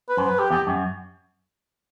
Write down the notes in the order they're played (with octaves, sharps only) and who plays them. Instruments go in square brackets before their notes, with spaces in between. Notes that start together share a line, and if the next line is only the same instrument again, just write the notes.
[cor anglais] B4
[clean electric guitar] F#2 [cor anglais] C5
[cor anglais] B4
G4
[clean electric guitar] E2 [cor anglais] G4
[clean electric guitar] F#2